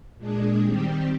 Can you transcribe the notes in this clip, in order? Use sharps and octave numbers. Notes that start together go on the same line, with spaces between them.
A#2 G#3 D4 G#4
D#3 G3 C4 G4